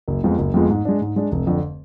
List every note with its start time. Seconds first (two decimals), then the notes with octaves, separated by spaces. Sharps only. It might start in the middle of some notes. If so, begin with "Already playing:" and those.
0.08 F#1
0.24 F2 F3 G#3 B3
0.38 F#1
0.54 F2 F3 G#3 B3
0.69 G#2
0.85 G#3 D4
1.01 G#2
1.16 G#3 D4
1.32 F1
1.47 F2 D3